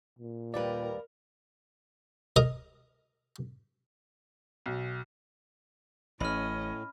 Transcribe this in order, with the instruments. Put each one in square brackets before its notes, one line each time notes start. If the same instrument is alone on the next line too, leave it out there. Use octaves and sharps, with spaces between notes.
[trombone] A#2
[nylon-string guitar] D#2 G3 B4 [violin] A#4 [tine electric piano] D5
[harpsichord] A#4 D#5 A#5 D#6
[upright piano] B1
[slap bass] A1 [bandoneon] A2 [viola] C#4 D#5 [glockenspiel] B5 F6